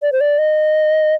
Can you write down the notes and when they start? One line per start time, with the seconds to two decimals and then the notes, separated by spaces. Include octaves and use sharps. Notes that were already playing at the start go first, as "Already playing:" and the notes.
0.02 D5
0.12 C5
0.21 D5
0.38 D#5